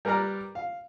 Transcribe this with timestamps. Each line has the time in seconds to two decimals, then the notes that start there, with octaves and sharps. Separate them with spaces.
0.05 G3 A#4 B4 D5 A#5 F6
0.55 F5